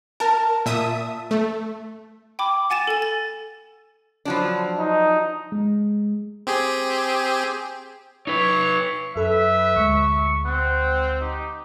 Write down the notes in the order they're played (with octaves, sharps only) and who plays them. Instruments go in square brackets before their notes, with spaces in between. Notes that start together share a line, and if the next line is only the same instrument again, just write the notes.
[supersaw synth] A#4 [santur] A5
[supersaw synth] A#2 E5 D#6
A3
[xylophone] G5 B5 D6
F#5 G#5 A6 D#7 E7
A4 G#5
A6
[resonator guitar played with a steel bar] F3 F#3 D4
[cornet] D#4
[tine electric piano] G#3
[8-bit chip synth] C4 G4 G#4
[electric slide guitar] D#4 B4 [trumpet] C#5
[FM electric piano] F#2 A4 B5 [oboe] B4 [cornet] E5
[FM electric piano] D2 G#3 [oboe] C#6
[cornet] C4 [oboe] F#5
[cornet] D#4 [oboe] G4